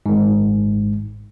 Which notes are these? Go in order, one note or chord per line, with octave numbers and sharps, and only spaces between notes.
G#1 G#2